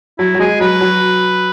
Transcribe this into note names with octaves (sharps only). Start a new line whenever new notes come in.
F#3 E4
F#3
G#3 G#4
F#3 B4
F#3